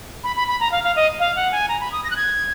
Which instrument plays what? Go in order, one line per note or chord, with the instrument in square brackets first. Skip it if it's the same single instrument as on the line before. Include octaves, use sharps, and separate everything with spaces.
[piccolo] B5
B5
B5
A#5
F5
F5
D#5
F5
F#5
G#5
A#5
B5
D#6
A#6
F#6
G#6